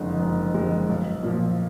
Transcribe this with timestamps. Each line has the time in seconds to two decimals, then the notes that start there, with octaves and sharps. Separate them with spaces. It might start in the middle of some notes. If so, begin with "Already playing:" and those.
Already playing: F#1 F2 D3 G#3
0.20 F#1
0.54 F2 D3 G#3
0.89 B1
1.23 A#2 F3